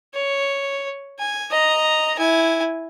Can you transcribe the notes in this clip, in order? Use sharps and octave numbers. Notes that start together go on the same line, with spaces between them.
C#5
G#5
D#5 A#5
E4 G#5